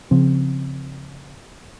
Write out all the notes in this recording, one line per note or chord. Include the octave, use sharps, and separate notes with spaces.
C#3 F3 C4